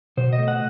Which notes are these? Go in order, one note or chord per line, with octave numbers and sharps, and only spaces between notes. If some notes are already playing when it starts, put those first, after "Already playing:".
B2 C5
D#5
A3
F#5